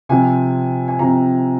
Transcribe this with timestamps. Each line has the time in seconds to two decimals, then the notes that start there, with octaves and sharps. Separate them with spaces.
0.09 C3 F3 C4 G#5
0.88 G#5
0.99 C3 F3 C4 A#5